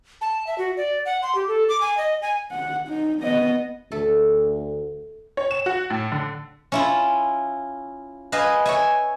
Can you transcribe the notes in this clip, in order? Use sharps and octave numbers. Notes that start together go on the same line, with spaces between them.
A5
E5
F#4
D5
F#5
C6
G4
A4
D6
G#5
D#5
G#5
F#5
D#4
B3 D#5
D2 A3 A4
C#5
E7
F#4
A2
D3
C#4 E4 F4
B4 D#5 F5 G#5
C#5 E5 G#5